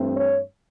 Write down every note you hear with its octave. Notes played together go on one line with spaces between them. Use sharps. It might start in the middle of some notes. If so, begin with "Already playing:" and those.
Already playing: G2 E3 A3 C4
C#5